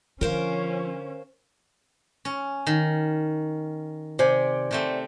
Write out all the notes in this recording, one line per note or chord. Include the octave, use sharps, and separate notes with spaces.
D3 F3 C#4 A#4 C5 F5
C#4
D#3
C3 C5 D5 G#5
C3 A3 C4